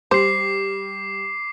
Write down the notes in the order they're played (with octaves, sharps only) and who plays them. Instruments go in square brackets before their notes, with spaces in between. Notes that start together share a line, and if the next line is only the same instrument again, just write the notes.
[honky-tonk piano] G3 [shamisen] C5 [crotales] D6 C7